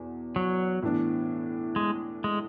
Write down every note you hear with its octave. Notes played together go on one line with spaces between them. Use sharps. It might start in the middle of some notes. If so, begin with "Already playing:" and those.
Already playing: E2 B2
F#3
A2 E3 B3 D4
G#3
G#3